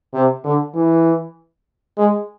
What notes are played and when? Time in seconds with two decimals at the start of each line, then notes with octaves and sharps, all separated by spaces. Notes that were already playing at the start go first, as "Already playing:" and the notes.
0.14 C3
0.45 D3
0.74 E3
1.98 G#3